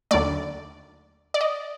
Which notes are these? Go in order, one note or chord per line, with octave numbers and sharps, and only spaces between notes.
D#2 D3 F#3 A3 D5
D5
D#5